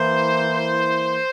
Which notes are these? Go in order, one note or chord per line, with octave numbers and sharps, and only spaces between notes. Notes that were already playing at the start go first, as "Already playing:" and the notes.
Already playing: E3 A#3 E4 C5